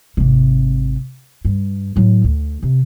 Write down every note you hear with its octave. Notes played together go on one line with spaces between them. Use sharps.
G#1 C3
G2
A2 F#3
D2
C3